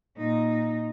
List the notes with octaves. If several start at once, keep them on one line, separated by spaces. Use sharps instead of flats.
A#2 D#4